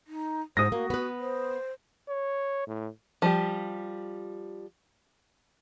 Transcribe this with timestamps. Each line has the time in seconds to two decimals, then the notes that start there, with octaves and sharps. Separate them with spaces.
0.07 D#4
0.57 G#2 C5 D#6 A#6
0.72 A#3 F#4
0.90 B3 B4
1.20 C5
2.09 C#5
2.67 A2
3.22 F3 G3 G4